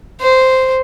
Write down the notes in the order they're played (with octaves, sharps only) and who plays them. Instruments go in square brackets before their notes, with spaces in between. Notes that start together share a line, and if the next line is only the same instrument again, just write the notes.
[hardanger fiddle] C5